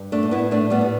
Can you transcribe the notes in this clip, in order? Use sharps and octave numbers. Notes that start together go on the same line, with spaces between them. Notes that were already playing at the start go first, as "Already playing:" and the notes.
Already playing: G2
A3 D4
A2
B3 E4
A2 A3 D4
G3 B3
A2